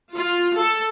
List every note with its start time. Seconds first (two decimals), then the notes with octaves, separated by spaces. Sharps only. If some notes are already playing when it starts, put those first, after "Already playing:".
0.14 F4
0.57 A4